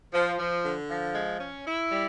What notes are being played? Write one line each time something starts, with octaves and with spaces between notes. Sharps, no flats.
F3
F3
D3
F3
G#3
C#4
E4
G3